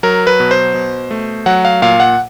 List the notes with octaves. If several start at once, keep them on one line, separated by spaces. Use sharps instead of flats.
F#3 A#4
B4
B2
C5
B2
A3
F#3 F#5
F5
A#2 F5
F#5